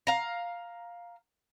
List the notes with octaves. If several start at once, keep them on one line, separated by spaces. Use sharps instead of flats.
F5 A#5